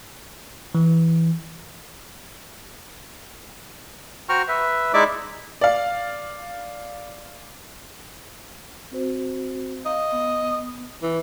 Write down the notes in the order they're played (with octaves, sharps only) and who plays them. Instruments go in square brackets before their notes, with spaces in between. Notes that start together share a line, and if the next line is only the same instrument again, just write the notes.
[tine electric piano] E3
[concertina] F#4 C5 G5 A#5 C#6 F6
B4 E5
G#3 D#4 E4 D5 E5 D6
[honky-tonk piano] D5 F5
[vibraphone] C4 F#4 C5
[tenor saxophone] D#5 [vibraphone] F5
[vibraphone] B3
[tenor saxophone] E3